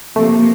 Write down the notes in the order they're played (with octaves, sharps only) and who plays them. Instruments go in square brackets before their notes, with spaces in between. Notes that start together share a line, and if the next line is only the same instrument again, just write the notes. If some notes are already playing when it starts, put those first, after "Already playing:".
[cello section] C3 F3 A#3 [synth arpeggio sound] A3